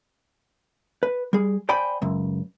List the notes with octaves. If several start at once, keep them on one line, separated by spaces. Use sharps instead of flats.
B4
G3 G#4
C5 D5 G5 G#5 B5
C#2 F#2